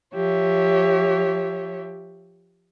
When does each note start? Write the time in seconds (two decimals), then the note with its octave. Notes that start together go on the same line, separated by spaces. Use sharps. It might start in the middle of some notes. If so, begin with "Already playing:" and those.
0.13 F3 G4 C#5 E5